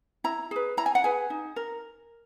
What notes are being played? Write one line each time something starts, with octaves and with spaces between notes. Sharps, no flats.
E4 A#5
G#4 B4
E4 A#5
G#5
F#5
G#4 B4 G#5
D#4
A#4